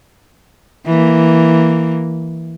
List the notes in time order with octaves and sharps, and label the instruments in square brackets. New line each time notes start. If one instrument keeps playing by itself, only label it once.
[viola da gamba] E3 A#3